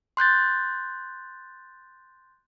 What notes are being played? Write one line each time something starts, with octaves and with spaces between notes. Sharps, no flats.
C6 F#6 G6 A6